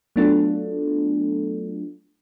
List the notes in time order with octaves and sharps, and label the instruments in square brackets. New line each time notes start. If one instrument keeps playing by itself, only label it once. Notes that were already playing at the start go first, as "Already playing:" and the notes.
[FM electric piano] F#3 A3 B3 D4 F4 A4